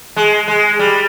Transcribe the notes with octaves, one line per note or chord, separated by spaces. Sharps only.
G#3
G#3
G3